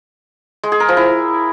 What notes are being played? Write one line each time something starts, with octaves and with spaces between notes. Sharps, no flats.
G#3
G#4
A#4
F3
E4